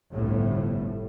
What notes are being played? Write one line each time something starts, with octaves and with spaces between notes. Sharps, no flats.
G1 C2 A2